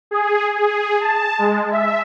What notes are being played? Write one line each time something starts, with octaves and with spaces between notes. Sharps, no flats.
G#4
G#4
A5
G#3
E5